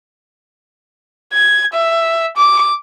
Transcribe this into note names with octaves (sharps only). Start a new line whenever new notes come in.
G#6
E5
D6